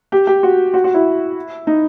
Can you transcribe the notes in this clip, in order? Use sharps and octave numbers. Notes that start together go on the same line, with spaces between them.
G4
G4
F#4
F#4
F#4
E4
D#4